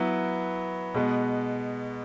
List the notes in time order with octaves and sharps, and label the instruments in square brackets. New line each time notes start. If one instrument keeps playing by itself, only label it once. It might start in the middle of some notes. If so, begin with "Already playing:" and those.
Already playing: [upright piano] F#3 B3 E4
B2 G#3 B3